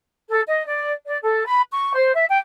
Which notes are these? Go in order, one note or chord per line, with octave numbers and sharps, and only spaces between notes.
A4
D#5
D5
D5
A4
B5
C#6
C5
E5
G5